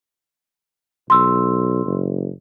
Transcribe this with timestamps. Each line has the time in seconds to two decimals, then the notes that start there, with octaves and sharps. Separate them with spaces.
1.10 B1 C6 E6
1.86 F#1